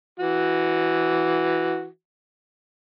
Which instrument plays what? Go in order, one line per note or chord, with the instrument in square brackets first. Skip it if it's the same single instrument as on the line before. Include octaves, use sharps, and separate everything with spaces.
[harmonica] E3 F#4